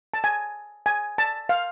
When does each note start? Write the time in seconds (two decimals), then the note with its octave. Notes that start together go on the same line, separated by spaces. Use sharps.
0.14 A5
0.24 G#5
0.86 G#5
1.18 A5
1.49 F5